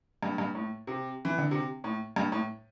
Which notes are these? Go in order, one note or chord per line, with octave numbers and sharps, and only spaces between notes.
G2
G2
A2
C3
E3
D3
C3
A2
G2
A2